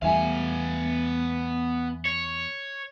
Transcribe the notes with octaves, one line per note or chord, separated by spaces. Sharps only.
E2 G3 A3 B3 E5 F5 G#5
C#5